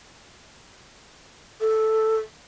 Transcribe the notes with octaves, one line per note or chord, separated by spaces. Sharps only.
A4